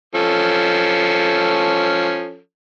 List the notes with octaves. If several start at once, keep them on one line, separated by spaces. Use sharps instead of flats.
F3 C#4 A4